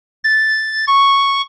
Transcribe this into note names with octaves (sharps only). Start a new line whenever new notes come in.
A6
C#6